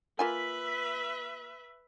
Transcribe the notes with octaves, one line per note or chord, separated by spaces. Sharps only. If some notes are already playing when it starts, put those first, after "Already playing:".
A#3 F4 B4 E5 G#5